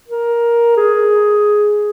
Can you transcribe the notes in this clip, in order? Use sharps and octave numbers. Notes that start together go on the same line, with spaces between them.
A#4
G#4